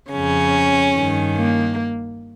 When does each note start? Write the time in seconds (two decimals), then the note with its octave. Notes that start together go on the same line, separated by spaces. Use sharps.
0.11 F2 C#3 C#4
0.94 G2 D#3
1.36 A#3